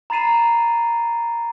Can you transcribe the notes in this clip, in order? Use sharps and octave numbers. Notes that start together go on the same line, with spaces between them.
A#5 B5 A6 C7 D#7 E7